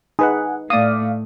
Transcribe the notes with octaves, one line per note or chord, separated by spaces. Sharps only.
D#4 G#4 B4 F#5
A2 A3 D5 F5 D#6